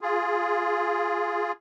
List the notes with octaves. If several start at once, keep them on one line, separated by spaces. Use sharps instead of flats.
F4 G#4